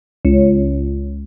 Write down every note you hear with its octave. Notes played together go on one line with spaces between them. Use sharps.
C#2